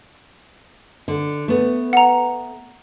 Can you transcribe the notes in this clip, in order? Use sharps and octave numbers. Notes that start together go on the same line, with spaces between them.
D3
A3 B3
F#5 A#5